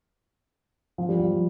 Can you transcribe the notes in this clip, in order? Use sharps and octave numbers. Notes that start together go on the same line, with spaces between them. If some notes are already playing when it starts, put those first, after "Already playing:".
F3
G3
F3